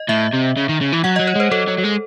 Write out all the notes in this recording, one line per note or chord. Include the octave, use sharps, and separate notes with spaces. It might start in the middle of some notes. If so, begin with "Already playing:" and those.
Already playing: D#5
A2 E5
C3
C#3
D#3
C#3
E3
F#3 F#5
D#5
F#3
C#5
G#3 C5
F#3 A4
F#3
F#3
G#3